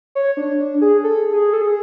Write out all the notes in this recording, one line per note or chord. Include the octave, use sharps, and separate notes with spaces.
C#5
D4
D4
G#4
A4
G#4
A4
G#4